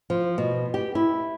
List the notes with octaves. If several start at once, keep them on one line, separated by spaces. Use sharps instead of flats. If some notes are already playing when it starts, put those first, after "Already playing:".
F3
B2
G4
E4